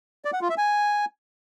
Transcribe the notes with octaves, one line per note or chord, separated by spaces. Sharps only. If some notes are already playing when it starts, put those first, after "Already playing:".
D5
F#5
F4
E5
G#5